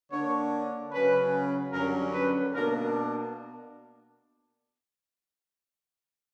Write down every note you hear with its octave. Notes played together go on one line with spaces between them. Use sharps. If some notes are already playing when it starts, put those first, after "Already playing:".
D3 A#3 D4 C#5
C#3 F#3 C#4 B4
F#2 D3 G3 C#4 A#4
B4
B2 A#3 D4 A#4